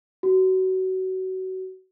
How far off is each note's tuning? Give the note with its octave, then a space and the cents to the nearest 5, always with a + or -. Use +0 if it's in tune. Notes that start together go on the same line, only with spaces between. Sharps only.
F#4 +25